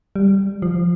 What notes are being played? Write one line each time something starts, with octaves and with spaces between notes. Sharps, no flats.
G3
F3